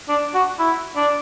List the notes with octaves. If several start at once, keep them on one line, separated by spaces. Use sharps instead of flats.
D4
F#4
E4
D4